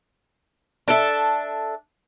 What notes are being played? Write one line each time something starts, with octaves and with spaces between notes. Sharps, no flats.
D4 A4 E5